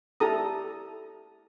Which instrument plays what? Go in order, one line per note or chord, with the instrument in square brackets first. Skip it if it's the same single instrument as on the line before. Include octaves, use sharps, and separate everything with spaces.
[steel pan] E4 G4 A4 A#5 D#6